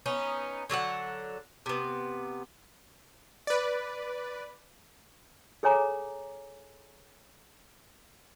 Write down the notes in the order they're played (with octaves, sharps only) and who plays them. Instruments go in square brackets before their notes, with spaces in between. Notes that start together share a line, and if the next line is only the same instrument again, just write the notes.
[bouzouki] B3 C#4 D#4
D3 F#3 D#5 F#5
C3 B3
[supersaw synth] B4 D5
[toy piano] G#4 A4 C#5 G#5 A#5 D6